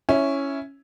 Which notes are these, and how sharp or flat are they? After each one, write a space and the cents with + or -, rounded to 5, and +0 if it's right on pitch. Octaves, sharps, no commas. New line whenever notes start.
C#4 +0 E4 +0